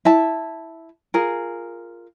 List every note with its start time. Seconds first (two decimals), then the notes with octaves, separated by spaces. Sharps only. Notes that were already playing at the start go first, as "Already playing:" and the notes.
0.05 E4 E5 A5
1.14 F4 G#4 A#4